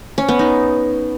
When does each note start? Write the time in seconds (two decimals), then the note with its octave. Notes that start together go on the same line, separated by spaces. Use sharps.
0.18 C#4
0.28 B3
0.39 D#4